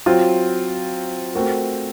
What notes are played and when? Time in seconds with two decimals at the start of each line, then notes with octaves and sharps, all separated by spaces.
0.06 F#3 C4 F4
1.35 A3 C4 F#4 A#4